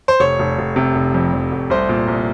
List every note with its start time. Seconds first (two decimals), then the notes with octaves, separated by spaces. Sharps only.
0.08 C5
0.20 F1 C#5
0.39 F1
0.58 F1
0.76 C3
0.95 F1
1.14 F2
1.34 F2
1.52 F1
1.70 C2 C5
1.89 A#2
2.08 C2